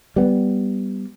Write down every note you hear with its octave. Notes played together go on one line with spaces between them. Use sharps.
G3 B3